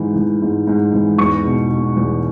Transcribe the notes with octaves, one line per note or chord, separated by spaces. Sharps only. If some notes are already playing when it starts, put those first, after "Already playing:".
Already playing: G#2 E3
E3
G#2
G#2
E3
E2 C#6
B2
B2
E2